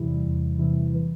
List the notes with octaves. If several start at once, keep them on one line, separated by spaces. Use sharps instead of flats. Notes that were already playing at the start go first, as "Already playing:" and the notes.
Already playing: E2 C3 E3 G3 E4
E2
C3 E3 G3 E4
E3